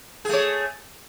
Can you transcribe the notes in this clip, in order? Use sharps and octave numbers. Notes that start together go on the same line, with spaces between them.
A3 G#4 C#5